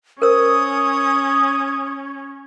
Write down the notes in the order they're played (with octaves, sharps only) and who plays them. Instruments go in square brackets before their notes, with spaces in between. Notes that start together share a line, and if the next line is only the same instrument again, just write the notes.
[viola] C#4 [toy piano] A#4 C5 E6 [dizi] D#6